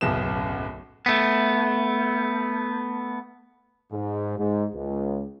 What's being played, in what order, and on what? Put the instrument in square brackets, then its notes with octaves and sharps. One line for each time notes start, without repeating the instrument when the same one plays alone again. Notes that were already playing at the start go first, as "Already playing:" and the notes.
[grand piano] D1 B1 F#2 C#3 B3 E7
[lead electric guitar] A3 B3
[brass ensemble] G#2
G#2
C#2